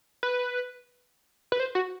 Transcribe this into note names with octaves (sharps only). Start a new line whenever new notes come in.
B4
B4
C5
F#4